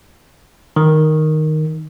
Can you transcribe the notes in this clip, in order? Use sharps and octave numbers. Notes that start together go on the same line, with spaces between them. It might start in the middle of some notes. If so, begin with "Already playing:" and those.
D#3